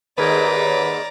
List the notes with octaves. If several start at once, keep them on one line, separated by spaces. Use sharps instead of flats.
D#2 G#2 G#4 A#4 B4 D5 A#5 G#6
C#5